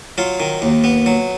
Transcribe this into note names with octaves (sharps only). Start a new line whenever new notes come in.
F#3 F4
D#3
D#2
B3
F#3